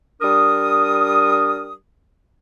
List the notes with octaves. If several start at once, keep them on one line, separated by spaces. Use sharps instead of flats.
G3 D4 A#4 D#6